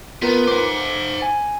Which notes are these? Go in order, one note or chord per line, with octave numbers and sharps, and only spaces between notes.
B3 F4 A#4 B4
C5 F#5 D6
G#5